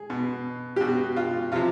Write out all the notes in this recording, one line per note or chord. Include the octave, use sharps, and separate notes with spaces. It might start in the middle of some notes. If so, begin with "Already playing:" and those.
Already playing: G#4
B2
G4
B2 F#4
F4
C3 F3 F4